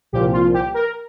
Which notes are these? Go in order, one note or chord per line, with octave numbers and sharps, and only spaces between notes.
C2 A#2 F3 G4
F4
G4
A#4